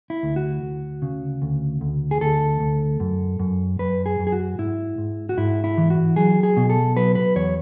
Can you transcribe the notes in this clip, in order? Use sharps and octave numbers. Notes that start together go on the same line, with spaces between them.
E4
D2
F#4
D2
C#3
D2
D2
G#4
D2 A4
D2
F#2
F#2
F#2 B4
G#4
F#2
G#4
F#4
G#2 E4
G#2
F#4
G#2 E4
E4
E3
F#4
F#3 G#4
G#4
B2
A4
F#3 B4
B4
E2 C#5